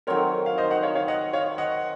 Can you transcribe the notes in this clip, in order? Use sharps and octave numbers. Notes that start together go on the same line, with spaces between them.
D#3 F#3 C4 A#4 C#5
F5
C5 D#5
D#5 F#5
C#5 F5
C#5 F5
D#5 F#5
C#5 F5
D#5 F#5